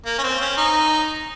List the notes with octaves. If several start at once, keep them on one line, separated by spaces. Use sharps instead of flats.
A#3
C#4
C4
C#4
D#4